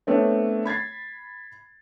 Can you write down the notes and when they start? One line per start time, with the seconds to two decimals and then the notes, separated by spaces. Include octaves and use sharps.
0.07 A3 B3 C4 D4 C#5
0.65 B5 G#6 A6 C7